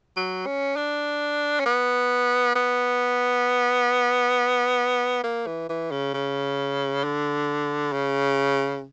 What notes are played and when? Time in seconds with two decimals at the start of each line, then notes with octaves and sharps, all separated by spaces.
0.17 F#3
0.46 C#4
0.76 D4
1.60 C#4
1.66 B3
2.56 B3
5.24 A#3
5.47 E3
5.69 E3
5.91 C#3
6.14 C#3
7.04 D3
7.93 C#3